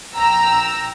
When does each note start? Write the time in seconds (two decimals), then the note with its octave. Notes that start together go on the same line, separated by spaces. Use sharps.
0.15 A#1 G5 A#5 E6